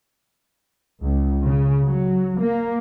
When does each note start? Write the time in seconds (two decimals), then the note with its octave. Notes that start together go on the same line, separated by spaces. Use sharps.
1.03 C#2
1.43 C#3
1.86 F#3
2.42 A#3